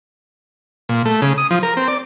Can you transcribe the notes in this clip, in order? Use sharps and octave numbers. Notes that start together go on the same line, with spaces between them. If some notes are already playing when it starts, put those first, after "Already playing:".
A#2
A3
C#3
D#6
F3
A#4
C4
D5